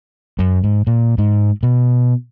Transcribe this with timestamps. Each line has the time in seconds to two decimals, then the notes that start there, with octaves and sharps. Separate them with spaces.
0.39 F#2
0.64 G#2
0.87 A#2
1.18 G#2
1.63 B2